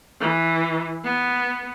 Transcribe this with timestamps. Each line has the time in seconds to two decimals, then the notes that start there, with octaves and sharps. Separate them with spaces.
0.21 E3
1.04 B3